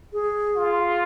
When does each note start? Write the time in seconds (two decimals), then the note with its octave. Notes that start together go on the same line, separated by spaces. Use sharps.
0.13 G#4
0.56 F4